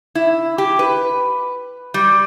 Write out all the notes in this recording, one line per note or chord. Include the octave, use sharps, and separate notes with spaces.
E4
G4
B4
G3